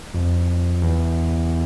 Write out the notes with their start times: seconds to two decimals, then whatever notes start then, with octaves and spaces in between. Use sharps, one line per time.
0.14 F2
0.82 E2